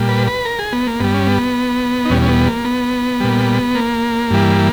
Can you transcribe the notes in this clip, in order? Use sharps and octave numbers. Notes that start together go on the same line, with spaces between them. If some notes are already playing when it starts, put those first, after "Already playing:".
Already playing: A#2 G3
B4
B4
A#4
G#4
B3
A#3
G2 G3 B3
C#4
B3
D#4
E2 B2 G3 C#4
C#4
B3
A#3
B3
A#2 G3
A#3
G2 E3 G3